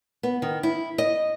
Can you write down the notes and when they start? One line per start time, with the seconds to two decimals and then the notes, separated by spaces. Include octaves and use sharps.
0.23 B3
0.42 D#3
0.63 E4
0.98 D#5